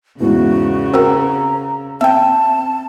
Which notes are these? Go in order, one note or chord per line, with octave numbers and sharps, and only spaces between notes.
E2 G#2 C#3 E4 F#4
C4 F#4 A#4 A#5 E6
C4 E5 G5 A5